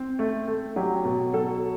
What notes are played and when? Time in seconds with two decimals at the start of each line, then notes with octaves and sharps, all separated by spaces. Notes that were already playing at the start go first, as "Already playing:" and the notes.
Already playing: C4
0.19 A3
0.47 A3
0.76 F#3 G4
1.05 B2
1.33 F#3 A4